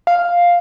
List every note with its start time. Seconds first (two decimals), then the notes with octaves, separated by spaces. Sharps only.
0.07 F5